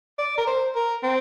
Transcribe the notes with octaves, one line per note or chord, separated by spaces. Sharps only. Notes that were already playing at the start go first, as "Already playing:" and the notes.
D5
A#4
C5
A#4
C4